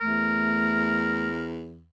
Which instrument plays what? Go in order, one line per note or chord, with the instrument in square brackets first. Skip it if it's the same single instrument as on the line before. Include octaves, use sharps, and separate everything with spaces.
[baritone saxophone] E2 [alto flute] A3 [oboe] A#4